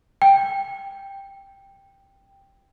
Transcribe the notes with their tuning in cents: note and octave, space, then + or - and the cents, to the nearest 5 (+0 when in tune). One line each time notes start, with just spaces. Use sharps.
G5 +5